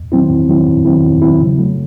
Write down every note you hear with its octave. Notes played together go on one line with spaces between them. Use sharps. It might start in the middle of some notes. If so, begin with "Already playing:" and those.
Already playing: E2
D#3 F#3 C4 E4
E2
D#3 F#3 C4 E4
E2
D#3 F#3 C4 E4
E2
D#3 F#3 C4 E4
C#3
F#3 A3